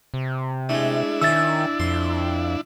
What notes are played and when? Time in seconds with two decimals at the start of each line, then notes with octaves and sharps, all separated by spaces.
0.14 C3
0.69 G#3 A3 D4 E4
1.22 D#3 C#4 E5 E6 A6
1.80 F2 C6